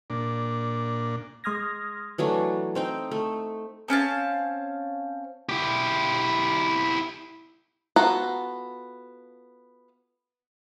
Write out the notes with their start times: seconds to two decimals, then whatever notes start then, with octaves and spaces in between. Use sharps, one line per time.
0.10 A#2 D4
1.44 G#3 C6 D#6 F6 G#6 A#6
2.18 E3 F#3 A3 D4
2.75 C4 D#4 G5
3.11 A3
3.88 C4 C#4 F5 A5
5.49 E4 G4
7.96 B3 F4 F#4 A4 A#5